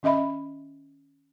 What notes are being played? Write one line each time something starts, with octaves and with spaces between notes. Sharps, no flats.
D#3 C#4 D#5 E5 B5